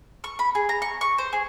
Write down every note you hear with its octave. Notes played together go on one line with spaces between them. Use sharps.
C#6
B5
G#4
A#5
C#6
C#6
C5
G#4